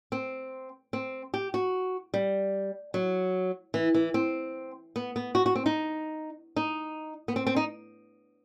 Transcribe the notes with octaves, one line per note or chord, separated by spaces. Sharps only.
C4
C4
G4
F#4
G3
F#3
E3
E3
C4
B3
B3
F#4
F#4
C4
D#4
D#4
B3
C4
C4
D#4